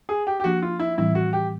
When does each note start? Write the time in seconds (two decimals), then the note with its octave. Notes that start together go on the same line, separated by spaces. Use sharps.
0.09 G#4
0.27 G4
0.40 G4
0.44 F3 A#3 D4 F#4
0.62 F4
0.79 E4
0.98 A2 E3 G3 C4 E4
1.15 F#4
1.33 G4